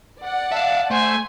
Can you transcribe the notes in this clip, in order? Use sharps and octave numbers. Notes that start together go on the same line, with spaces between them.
D5 F#5
E5 F5 A5
A3 C5 G#5